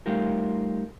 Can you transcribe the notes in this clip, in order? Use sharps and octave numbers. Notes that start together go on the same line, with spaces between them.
G3 A3 D#4 F4 G4 A#4